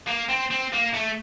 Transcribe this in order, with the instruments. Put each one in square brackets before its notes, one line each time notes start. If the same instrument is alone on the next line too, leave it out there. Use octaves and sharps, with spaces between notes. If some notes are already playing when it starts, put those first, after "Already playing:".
[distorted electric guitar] A#3
C4
C4
A#3
A3